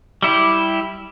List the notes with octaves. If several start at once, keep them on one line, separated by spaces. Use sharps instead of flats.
G3 E4 G4